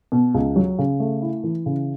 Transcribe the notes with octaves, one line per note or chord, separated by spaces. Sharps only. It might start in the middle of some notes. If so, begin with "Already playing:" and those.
B2
C#2
F#3
C#3
A3
E4
E3
C#3